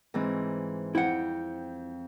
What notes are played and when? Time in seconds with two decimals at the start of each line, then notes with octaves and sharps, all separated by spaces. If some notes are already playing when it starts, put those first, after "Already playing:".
0.14 G#2 E3 C4
0.95 F2 E4 F#5 G5